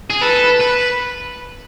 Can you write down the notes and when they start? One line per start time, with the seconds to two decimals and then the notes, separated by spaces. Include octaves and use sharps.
0.10 G#4
0.22 A4 B4
0.61 B4